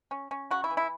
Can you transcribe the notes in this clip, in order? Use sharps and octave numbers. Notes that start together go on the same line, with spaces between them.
C#4
C#4
C#3 F#4
E4
E3
E4